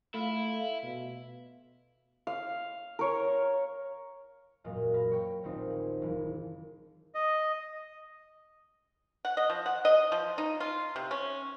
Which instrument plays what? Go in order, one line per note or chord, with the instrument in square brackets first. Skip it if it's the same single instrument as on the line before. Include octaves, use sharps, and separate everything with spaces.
[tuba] A3 [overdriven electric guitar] E4 [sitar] F4
[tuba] B2
[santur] F5
A#4 C#5
[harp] E1 F#2 A#2 F#4 D#5 F5
F5 B5 A#6
C#5 G5 C#6
D#1 A#1 C4 D#4 F4
G#4
F#1 E3
[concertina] D#5
[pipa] F#5
D#5
F3
F#5
D#5
F3
D#4
F4
C3
C#4